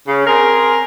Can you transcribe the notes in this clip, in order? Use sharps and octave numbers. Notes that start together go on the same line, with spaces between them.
C#3
C4 G#4 A#4